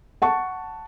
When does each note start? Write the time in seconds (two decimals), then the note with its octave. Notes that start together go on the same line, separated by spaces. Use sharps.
0.22 F#5 A5 C#6